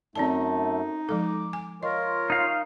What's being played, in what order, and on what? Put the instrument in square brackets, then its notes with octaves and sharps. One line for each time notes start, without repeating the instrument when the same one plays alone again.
[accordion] F#2 A3 [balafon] C4 D5 A5 [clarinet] D#4
[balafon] F3 G#3 A4 [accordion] D6
[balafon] G#5
[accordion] F4 C#5 [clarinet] A#4 [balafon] D#5
[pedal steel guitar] D#4 F5